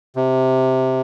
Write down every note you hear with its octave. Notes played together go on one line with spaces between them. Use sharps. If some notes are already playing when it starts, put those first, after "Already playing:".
C3